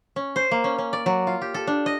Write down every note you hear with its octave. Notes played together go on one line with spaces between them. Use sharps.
C#4
C5
A#3
C#4
C#4
D5
F#3
F4
G4
A4
D4
D#5